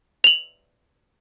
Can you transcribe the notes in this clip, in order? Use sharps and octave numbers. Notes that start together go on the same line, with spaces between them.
F7 F#7